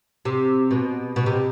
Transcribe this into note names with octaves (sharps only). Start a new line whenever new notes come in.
C3
B2
B2
C3